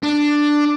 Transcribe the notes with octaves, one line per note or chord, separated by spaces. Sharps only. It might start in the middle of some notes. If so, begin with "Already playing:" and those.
D4